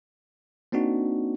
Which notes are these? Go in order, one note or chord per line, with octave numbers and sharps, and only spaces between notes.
A#3 C4 D4 D#4 F#4